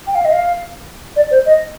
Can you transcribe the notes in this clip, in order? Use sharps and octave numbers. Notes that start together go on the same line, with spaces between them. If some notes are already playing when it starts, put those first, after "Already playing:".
G5
F5
D#5
F5
D5
C5
D#5